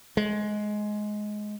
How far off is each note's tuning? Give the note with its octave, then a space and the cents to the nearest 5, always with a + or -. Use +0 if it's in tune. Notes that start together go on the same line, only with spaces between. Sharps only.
G#3 +15